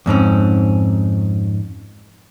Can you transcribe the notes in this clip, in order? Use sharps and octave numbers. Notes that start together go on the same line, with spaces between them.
F2 G#2 C4 C#4